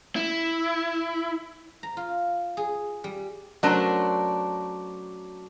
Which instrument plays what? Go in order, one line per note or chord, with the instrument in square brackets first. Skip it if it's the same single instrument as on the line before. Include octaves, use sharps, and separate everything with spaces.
[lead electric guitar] E4
[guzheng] A#5
F4
G#4
G3
[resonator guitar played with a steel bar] F#3 A3 C#4 D4 A#4 C5